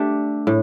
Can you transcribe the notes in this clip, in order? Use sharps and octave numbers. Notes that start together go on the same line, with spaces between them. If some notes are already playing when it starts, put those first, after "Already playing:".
Already playing: A3 D4 G4
A2